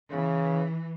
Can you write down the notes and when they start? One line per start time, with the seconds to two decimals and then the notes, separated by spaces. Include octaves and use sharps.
0.11 C#3 E3